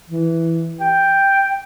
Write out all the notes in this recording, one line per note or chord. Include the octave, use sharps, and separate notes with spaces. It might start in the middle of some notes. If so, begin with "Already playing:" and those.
E3
G5